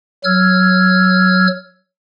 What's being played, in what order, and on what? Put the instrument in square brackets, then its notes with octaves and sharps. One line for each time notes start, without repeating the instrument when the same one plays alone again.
[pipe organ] F#3 E6 F6 G#6